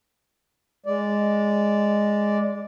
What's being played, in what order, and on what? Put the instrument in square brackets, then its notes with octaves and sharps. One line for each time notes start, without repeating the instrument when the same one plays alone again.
[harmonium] G#3 D5